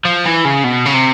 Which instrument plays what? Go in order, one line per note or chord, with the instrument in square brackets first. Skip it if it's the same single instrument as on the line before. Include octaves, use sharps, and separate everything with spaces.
[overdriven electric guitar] F3
E3
C#3
B2
C#3
C3